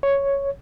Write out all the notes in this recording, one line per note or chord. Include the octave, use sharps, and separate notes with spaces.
C#5